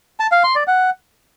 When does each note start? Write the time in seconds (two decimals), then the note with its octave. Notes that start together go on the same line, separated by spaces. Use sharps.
0.20 A5
0.32 F5
0.44 C6
0.56 D5
0.67 F#5